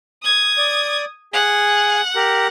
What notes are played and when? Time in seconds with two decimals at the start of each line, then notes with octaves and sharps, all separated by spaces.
0.23 D#6 G#6
0.58 D5
1.34 G#4 F#5 G#5
2.16 G4 A#4